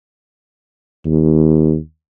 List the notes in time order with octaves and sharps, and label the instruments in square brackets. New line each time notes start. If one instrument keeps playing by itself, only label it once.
[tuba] D#2